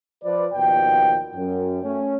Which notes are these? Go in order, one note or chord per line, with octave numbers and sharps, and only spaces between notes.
F3 B4 D5
D#2 B2 F3 G5
F#2
A3 C#4